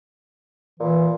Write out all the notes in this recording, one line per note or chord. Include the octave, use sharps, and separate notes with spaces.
A#2 E3